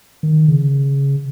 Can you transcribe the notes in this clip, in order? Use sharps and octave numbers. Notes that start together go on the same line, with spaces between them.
D#3
C#3